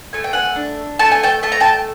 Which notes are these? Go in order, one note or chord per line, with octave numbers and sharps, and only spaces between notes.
A3 G#5
G5
F#5 G#5
D4
A3 A5
G#5
G5 A5
A3 A5
A#5
G5 A5